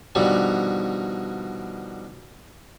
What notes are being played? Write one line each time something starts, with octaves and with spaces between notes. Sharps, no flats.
B2 D3 D#3 F3 G3